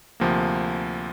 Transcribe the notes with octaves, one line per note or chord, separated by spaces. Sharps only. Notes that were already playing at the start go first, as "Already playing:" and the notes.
D2 C3 F3 A#3